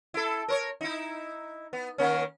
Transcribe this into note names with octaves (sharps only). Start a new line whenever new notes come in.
E4 A4
A#4 C5 C#5
D#4 E4
B3
D#3 A#3 C#4